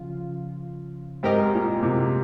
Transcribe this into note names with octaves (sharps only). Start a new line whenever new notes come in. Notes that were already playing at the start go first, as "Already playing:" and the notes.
Already playing: C#3 F3 F4
G#2 C4 G4 A#4 D#5
A#2
C3